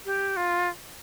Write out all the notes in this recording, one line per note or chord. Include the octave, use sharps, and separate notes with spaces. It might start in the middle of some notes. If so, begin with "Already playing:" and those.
G4
F4